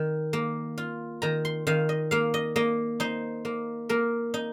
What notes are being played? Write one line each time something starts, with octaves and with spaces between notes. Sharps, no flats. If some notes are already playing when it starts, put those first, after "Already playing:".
Already playing: D#3
A#3
F4
D#3 A#5
C6
D#3 F5
D#5
A#3 F5
D#5
A#3 D#5
D#4 C5
A#3
A#3 A#4
D#4